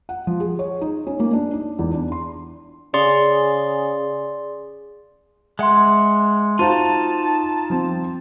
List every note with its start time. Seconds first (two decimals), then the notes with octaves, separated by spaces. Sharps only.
0.09 F#5
0.27 F3
0.40 G#4
0.59 C#5
0.81 D#4
1.07 C#4
1.20 A#3
1.33 D4
1.53 D#4
1.79 E2
1.91 D4
2.12 C6
2.94 C#3 G#4 D5 C6
5.59 G#3 E5 F#5 C6
6.59 D#4 F4 F#4 C5 F5 A5 D#7
7.70 F3 C4